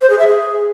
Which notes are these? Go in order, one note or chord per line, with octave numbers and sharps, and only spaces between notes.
C5
G#4
E5
G#4